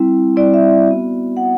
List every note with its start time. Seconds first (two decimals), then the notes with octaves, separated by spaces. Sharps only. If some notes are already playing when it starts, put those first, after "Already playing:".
Already playing: G3 C4 E4
0.36 G3 C4 E4 D5
0.54 E5
0.87 B3 F#4
1.37 B3 F#4 F#5